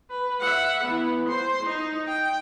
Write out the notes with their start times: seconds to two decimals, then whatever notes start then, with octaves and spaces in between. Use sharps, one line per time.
0.10 B4
0.40 E5 F#5
0.84 E3 B3
1.29 C5 C6
1.63 D#4
2.08 G5